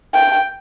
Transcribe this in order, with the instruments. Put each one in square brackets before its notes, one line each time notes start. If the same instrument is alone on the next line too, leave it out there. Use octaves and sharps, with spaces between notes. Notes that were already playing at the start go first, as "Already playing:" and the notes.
[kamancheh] G5